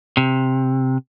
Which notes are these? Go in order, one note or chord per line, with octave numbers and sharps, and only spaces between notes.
C3